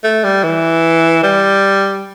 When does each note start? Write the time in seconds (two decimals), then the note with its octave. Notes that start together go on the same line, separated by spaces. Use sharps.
0.04 A3
0.24 G3
0.44 E3
1.23 G3